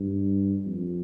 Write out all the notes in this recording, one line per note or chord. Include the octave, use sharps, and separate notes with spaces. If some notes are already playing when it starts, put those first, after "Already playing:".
Already playing: G2
F2